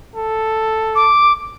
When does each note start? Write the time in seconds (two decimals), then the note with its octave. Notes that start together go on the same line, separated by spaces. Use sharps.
0.15 A4
0.95 D6